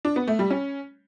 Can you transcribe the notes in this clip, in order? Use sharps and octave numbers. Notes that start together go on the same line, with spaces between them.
D4
B3
A3
G3
C#4